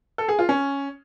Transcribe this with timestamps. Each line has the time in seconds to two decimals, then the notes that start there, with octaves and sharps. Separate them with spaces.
0.18 A4
0.28 G#4
0.39 F4
0.49 C#4